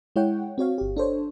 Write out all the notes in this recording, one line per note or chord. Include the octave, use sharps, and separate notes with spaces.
G#3 E4 C#5 F#5 G5
C4 F#4 C#5 F5
G1 G4
D4 A4 C5 C#5